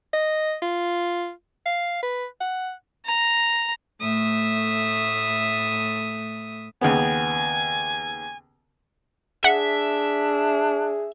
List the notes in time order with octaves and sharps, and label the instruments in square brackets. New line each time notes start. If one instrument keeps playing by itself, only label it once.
[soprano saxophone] D#5
F4
F5
B4
F#5
[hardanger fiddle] A#5
[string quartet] A2 A3 E5 D#6
[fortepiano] D#2 C#3 B3 [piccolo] G#5
[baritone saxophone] D4 [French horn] G#4 [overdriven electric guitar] E5 [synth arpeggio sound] F#5